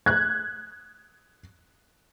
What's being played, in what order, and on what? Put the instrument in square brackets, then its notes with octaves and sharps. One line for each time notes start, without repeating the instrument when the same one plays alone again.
[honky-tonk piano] F#6 G#6